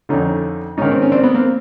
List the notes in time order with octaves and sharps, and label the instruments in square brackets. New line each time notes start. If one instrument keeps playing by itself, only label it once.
[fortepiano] F2 D3 C#4 D#4
G#2 D#3 C#4 D#4
C4
C#4
C4 D4
B3
A#3 C4